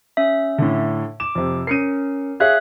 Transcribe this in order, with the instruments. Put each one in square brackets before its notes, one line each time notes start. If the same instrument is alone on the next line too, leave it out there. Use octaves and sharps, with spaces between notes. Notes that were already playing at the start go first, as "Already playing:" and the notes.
[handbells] C#4 E5
[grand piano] A2 D3
[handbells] D6 [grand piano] E7
[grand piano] F2 C3
[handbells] C#4 A#4 [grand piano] C7 C#7 D#7
[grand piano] G#4 C#5 F5 [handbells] E5 F#6 G#6